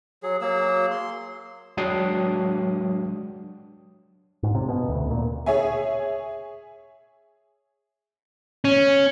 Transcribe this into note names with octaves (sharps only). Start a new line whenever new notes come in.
F#3 G#4
F#3 A#3 G#4 E6
C6
F#3 G#3 D4 G5 D#6 C7
G#2
C3
B2
D2
A#2
G#4 C#5 E5 G#5
C#4